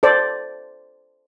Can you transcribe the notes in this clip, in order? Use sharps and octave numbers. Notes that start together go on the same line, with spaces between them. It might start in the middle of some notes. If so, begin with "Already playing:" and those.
A4 C5 D5